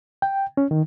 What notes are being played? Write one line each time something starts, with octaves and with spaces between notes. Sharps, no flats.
G5
C#4
D#3